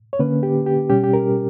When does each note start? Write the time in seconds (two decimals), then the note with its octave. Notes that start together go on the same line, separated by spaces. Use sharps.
0.13 C#5
0.19 D3 A#3 C#4 B4
0.43 G4
0.66 G4
0.90 B2 G3 C#4 G4
1.04 G4
1.14 A#4